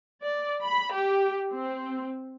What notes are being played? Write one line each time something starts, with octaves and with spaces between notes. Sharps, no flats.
D5
B5
G4
C4